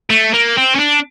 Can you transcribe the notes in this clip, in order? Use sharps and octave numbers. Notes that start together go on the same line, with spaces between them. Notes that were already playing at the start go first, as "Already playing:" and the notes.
A3
A#3
C4
C#4
D4